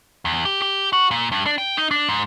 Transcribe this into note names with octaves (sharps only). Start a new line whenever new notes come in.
E2
G4
G4
F#4
A#2
G2
D4
G5
D#4
D4
G#2